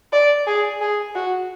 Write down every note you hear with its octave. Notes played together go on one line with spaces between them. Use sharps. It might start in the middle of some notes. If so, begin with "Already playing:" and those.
D5
G#4
G#4
F#4